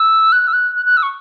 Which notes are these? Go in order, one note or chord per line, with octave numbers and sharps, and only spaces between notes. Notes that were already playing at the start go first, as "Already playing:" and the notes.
Already playing: E6
F#6
E6
F#6
F#6
F#6
E6
C#6